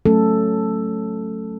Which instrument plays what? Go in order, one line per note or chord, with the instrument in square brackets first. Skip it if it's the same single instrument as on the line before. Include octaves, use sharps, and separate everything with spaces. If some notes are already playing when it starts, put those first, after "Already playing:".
[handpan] F#3 A3 C#4 A4